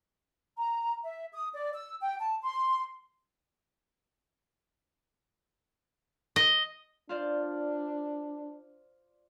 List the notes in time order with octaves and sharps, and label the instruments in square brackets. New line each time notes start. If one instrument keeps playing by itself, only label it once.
[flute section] A#5
E5
D#6
D5
E6
G5
A5
C6
[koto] D#5
[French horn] D4 [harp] F4 C5 D5